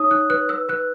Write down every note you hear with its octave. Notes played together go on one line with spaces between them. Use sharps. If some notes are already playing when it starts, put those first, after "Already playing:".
Already playing: D#4 C#5 D#6
D#4 F#6
B4 F#6
B4 E6
B4 F#6